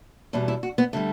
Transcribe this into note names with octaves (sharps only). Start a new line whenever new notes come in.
E2 B2 G3 D4
E4
F#4
B3
D3 G3 A3